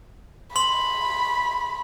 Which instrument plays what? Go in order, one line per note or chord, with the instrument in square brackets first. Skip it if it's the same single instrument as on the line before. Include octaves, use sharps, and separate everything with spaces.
[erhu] B5 [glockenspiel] C6 F#7